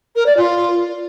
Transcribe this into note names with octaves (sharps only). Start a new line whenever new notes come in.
A#4
D5
F4